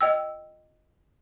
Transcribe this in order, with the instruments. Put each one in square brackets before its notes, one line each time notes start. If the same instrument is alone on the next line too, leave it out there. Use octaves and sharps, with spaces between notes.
[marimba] D#5 G5 E6